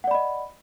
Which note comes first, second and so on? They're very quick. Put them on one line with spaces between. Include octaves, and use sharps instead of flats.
F#5 D5 B5 D#5